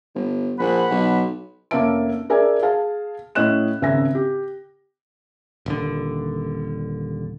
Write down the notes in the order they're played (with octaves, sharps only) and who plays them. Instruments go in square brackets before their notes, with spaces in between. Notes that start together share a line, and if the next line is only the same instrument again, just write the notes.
[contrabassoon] G1
[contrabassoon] A#1 [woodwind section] F#5 B5
[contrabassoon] B1
[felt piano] F1 A#3 C#4 E5 A5 D7
D4 G#4 A#4 D5 E5 G#5
G#4 F5 A5
A2 C#4 D#5 F#6 E7
G#1 C#3 E5 G#5 A#6
G4
[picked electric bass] D#1 D3